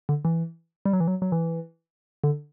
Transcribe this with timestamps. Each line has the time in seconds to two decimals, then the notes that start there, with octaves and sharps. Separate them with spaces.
0.09 D3
0.25 E3
0.86 G3
0.93 F#3
1.00 E3
1.08 F#3
1.22 F#3
1.32 E3
2.24 D3